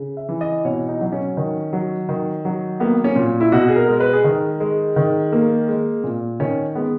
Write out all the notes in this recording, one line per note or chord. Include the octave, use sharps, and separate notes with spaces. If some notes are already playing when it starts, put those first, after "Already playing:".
Already playing: C#3
E5
E3
D#5
B2 C#5
D#4
F#3 D#4
C#4
D#3
F#3
D#3
F#3
A#3 B3
C#4
A#2
E4
B2 F#4
G#4
A#4
G#3
B4
G#4
D#3 A#4
G#3
D#3
A#3
G#3
A#2
D#3 C#4
G#3 B3